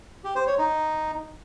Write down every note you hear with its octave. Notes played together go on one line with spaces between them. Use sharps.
G4
C5
C#5
D#4